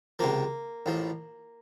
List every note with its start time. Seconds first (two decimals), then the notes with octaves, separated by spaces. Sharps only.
0.19 C#2 C3 F3 A#3
0.86 A1 A2 F3